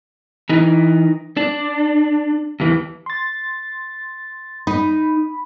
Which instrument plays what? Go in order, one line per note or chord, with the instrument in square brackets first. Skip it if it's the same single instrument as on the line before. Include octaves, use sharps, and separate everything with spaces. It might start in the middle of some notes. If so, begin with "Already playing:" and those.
[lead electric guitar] E3 D#4
D4
D#2 E3
[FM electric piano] C6 A6
[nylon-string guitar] D#4 [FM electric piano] B5